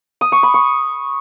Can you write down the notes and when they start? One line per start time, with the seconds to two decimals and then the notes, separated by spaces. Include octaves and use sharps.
0.21 D#6
0.32 C#6
0.43 B5
0.54 C#6